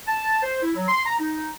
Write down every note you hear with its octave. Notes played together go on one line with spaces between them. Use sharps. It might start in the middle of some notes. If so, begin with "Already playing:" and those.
A5
C5
E4
F#3
C6
A#5
D#4